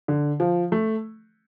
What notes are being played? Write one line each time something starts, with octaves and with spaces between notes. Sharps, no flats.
D3
F3
A3